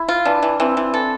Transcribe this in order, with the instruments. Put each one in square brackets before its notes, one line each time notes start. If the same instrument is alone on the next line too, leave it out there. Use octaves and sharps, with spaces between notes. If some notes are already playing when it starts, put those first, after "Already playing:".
Already playing: [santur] E4
[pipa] F4
[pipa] E3 [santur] D4
[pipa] E3
[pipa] E3 [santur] C4
[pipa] E3
A4